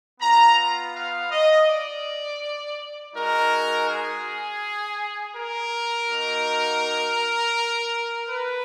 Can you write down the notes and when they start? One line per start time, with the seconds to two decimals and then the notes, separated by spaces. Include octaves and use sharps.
0.20 B3 F4 A#5
0.94 F5
1.31 D#5
1.67 D5
3.14 G#3 D#4 F#4 A#4
3.88 G#4
5.35 A#4
6.08 A#3 D#4 F#4
8.28 B4